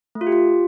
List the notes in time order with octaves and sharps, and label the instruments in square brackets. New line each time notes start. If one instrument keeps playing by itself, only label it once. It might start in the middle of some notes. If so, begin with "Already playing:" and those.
[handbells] A3
F4
G4
F4